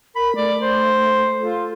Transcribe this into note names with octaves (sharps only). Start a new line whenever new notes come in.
A#4 B5
A3 D5
C5
F4 A4